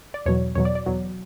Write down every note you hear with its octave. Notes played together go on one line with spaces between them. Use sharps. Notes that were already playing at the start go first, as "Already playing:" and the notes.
D5
E2 B2 F#3 C#5
E2 B2 F#3 C#5
D5
D5
E2 B2 F#3